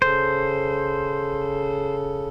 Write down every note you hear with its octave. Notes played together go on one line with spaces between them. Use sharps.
C#3 A4 C5